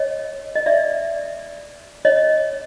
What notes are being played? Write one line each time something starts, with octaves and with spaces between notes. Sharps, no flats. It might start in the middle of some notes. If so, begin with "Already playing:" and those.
Already playing: C#5 D#5
D#5
D5 E5
C#5 D#5